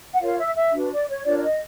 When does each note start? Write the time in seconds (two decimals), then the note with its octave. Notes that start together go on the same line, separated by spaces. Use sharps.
0.13 F#5
0.20 F4 A#4 C#5 F5
0.38 E5
0.55 E5
0.73 D4 F#4 B4
0.91 D5
1.08 C#5
1.25 D4 F4 A#4 C#5 D5
1.38 D5
1.43 D#5